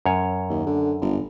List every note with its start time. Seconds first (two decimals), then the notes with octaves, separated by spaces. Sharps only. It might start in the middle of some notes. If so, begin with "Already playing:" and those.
0.06 F#2 C#5
0.50 D#2
0.66 D3
1.01 G1